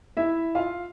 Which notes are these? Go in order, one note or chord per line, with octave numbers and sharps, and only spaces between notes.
E4 E5
F4 F5